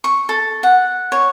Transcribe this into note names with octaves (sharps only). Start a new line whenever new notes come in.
C#6
A4
F#5
C#5